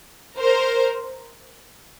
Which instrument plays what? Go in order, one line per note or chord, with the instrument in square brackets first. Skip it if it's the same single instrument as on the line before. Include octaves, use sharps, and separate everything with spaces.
[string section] A#4 C5